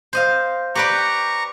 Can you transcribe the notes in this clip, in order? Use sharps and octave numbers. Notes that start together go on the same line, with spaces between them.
C5 D#5 F5
G4 B4 D5 A#5 C#6